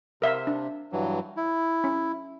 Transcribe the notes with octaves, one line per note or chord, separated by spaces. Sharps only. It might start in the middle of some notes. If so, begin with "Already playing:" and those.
C3 A#4 E5 F5
D4
G2 E3 F#3
E4
C#4